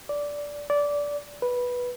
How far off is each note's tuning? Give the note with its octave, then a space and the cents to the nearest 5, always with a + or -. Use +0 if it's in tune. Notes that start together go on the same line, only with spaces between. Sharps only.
D5 -10
D5 -15
B4 -10